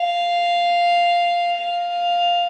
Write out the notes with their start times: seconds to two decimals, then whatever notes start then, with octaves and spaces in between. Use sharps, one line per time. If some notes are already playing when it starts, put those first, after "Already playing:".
Already playing: F5
1.58 F5